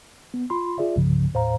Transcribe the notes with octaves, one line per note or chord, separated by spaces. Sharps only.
B3
F4 B5 C6
F4 G#4 D5 E5
C2 G2 C#3 F3
D#2 A2 C5 F5 A#5